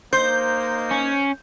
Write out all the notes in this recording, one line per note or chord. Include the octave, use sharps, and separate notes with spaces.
A#3 D#4 C5 G6
C#4